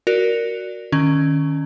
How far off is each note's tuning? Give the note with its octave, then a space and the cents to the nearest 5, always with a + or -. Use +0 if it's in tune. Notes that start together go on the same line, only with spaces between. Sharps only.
F#4 +0 A#4 +0 D5 +0
D#3 -20 C#4 +0